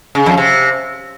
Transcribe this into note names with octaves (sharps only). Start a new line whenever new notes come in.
C#3
F2
C3